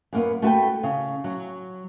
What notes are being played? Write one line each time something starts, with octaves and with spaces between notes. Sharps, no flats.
F#2 A#3 B3
A3 F#4 B4 G5
C#3
F#3